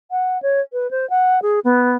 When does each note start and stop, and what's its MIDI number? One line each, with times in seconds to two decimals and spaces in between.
0.11 0.41 78
0.42 0.61 73
0.73 0.90 71
0.91 1.08 72
1.10 1.39 78
1.42 1.60 68
1.64 1.97 59